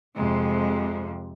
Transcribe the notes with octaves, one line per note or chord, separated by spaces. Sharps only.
F2 C3 G#3